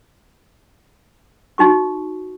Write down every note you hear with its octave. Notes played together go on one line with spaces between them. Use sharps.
D#4 F#4 C#6